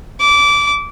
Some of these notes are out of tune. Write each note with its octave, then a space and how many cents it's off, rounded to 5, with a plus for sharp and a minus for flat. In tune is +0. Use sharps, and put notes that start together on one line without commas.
D6 -20